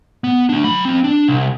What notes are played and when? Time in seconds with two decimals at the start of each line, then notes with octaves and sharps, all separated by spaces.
0.24 B3
0.49 A3 D4
0.64 F#3 B5
0.85 F3 C4
1.04 D4
1.28 C2